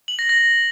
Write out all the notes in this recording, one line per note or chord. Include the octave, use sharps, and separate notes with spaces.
F#7
A#6
A#6